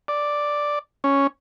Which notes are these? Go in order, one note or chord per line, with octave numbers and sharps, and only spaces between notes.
D5
C#4